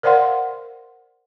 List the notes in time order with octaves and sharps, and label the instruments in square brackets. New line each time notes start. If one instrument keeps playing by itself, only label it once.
[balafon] A#4 C5 D5 F5 F#5 C6